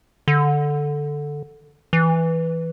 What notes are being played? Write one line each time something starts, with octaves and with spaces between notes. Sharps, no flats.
D3
E3